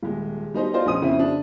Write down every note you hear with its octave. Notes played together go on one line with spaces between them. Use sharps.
D#1 G#3
G3 D#4 C5 D#5
F4 C5 D5 D#5
A#1 C#4 D#6 D#7
F2 C#3 C4 E4
D4